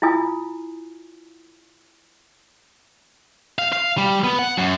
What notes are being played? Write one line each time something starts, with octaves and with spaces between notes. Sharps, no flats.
E4 F4 G#5 D#6
F5
F5
G3
B3
F#5
F#2